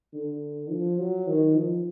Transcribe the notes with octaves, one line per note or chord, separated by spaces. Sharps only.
D3
F3
F#3
D#3
F3